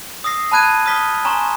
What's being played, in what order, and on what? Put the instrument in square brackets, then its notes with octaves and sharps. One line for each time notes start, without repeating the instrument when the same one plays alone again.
[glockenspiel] D#6 E6 A#6 C7
A5 B5 F#6 G#6 D#7
D#6 F6 A6 B6 G7
G#5 A#5 C6 C#6 E7